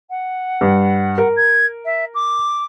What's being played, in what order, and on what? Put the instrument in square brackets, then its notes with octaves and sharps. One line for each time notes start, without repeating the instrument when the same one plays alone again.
[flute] F#5
[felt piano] G2
A#4
[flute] G#6
E5
D6